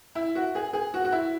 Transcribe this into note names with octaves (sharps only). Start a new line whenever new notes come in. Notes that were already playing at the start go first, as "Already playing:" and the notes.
E4
F#4
G#4
G#4
F#4
F#4
E4